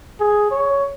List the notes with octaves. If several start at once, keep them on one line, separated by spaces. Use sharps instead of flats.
G#4
C#5